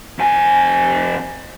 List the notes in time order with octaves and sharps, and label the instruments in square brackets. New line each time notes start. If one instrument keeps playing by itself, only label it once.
[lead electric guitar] F2 G#5